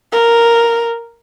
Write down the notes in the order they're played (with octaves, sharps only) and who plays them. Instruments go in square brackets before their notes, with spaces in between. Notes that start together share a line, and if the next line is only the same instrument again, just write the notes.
[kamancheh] A#4